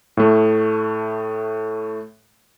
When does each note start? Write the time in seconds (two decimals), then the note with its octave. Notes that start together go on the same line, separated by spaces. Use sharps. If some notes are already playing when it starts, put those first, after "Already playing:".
0.17 A2 A3